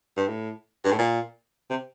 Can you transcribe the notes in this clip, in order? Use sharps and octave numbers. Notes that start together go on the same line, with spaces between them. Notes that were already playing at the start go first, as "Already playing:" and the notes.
G2
A2
G2
A2
A#2
C3